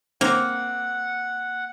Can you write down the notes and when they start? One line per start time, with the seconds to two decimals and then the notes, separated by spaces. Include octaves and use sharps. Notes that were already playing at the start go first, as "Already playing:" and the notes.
0.21 A#3 C4 F#5